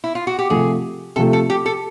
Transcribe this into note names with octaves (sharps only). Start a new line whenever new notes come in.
E4
F4
F#4
G4
C3 F3 A3 G#4
C3 F3 A3 A4
A4
G4
A4